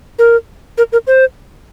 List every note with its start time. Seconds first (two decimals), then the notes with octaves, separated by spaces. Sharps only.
0.19 A#4
0.78 A#4
0.92 A#4
1.07 C5